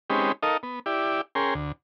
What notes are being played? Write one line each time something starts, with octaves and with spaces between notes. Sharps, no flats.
G#3 C4 C#4 D#4 G4 B4
D#4 A4 A#4 D#5 F5
B3
E4 G4 D5
C#4 G#4 A#4 G5 C6
D2